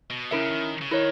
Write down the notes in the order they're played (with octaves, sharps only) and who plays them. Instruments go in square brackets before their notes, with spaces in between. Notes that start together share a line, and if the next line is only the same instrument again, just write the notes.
[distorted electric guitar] B2
[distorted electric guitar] C#3 [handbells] C#4 E4 A#4 E5
[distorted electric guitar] D#3
C#3
[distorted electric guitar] D#3 [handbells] E4 A#4 C#5